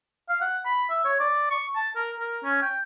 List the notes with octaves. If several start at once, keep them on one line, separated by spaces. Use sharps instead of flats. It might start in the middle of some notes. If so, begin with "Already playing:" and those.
F5
F#5
B5
E5
C#5
D5
C#6
A5
A#4
A#4
C#4
G5